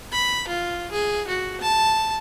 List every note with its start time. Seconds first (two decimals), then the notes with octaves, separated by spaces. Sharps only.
0.12 B5
0.48 F4
0.92 G#4
1.28 F#4
1.61 A5